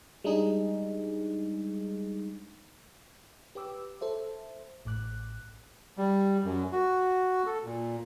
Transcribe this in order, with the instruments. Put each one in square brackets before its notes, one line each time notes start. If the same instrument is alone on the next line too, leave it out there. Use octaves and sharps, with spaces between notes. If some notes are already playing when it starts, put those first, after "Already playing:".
[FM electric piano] G3 G#3 D4 D#4 G#4
G4 B4 G5 D6 E6
A4 C5 E5
A1 A2 D6 F#6
[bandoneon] G3
F#2
F#4
A4
A#2